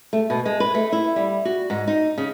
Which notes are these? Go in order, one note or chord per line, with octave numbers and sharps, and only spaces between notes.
A3
B2
G#3
B4
A3
E4
G3
F#4
G#2
D#4
C#3